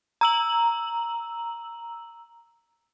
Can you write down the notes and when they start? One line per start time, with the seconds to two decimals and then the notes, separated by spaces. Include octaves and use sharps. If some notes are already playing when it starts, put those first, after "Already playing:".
0.21 A#5 E6 F#7